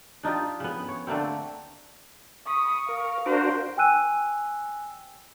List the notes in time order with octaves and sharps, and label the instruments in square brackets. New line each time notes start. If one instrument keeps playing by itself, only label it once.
[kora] D4 D#4 F4 G4
C#3 B3
C#5
D3 A3 A#3 C4
[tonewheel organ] B5 [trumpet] C#6 [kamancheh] D#6
[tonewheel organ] A#4 [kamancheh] F5
[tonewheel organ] D4 F#4 A#4 [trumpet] C5
[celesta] G5 G#5 E6 F#6 D#7